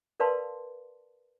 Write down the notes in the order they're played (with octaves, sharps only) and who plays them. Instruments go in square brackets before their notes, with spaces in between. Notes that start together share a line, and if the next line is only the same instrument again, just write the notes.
[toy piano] A#4 B4 D5 F5 A5 C6